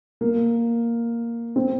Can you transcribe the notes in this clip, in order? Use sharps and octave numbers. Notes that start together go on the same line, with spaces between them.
A#3
C4